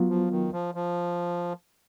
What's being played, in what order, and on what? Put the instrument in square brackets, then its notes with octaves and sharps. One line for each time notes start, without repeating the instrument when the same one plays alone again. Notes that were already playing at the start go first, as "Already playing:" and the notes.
Already playing: [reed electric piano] F#3 B3 F4
[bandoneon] F3
D#3
F3
F3